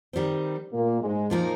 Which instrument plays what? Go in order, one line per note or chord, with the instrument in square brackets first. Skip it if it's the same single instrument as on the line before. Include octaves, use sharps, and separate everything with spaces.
[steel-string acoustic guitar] D#3 G3 C4
[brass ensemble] A#2 A#3
G#2 G#3
[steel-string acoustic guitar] A#2 F3 A#3 D#4 A#4